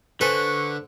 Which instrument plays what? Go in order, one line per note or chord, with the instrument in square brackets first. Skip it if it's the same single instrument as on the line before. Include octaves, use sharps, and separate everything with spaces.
[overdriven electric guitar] D3 [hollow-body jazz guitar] A4 C5 G#5 [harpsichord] B4 [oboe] C#6